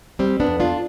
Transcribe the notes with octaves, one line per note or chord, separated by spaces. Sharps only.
G3 C4
B3 D4
F2
D4 F4